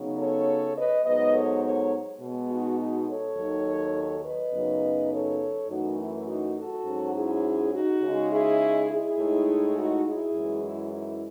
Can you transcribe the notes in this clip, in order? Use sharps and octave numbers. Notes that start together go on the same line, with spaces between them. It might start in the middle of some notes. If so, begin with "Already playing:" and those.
Already playing: C#3 F#3 B3 D#4
A4 C#5
B4 D#5
G#2 F#3 B3 B4 D#5
A4 C#5
A4 C#5
B2 G#3 B3
D#4 F#4
D#4 F#4
A4 C#5
D#2 D#3 F#3
B4 D#5
F#2 C#3 F#3 B3 D#4
A4 C#5
F#2 E3 A3 D#4 F#4
E4
D#4 F#4
F#4 A4
G#2 F#3 C#4
E4 G#4
D#4 F#4
C#3 G#3 D#4
E4 G#4
E4 G#4
A2 G#3 D#4
D#4 F#4
E4 G#4
F#2 E3 G#3
E4
E4